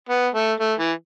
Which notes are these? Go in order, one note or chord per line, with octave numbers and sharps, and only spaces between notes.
B3
A3
A3
E3